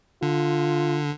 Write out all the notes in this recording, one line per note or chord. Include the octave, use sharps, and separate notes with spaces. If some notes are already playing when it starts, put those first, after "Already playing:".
D3 F4